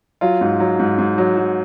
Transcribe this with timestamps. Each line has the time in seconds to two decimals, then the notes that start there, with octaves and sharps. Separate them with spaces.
0.21 F#3 F4
0.41 G#2
0.60 F#3
0.80 G#2
0.98 G#2
1.18 F#3
1.37 F#3